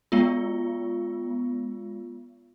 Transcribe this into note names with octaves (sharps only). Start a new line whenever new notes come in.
G#3 B3 F4